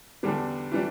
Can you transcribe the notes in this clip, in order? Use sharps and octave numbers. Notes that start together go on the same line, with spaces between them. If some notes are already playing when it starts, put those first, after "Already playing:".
E2 D3 G3 D4
E3 G3 D4